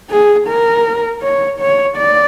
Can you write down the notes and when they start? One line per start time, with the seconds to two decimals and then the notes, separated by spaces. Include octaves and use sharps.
0.10 G#4
0.48 A#4
1.22 C#5
1.60 C#5
1.97 D5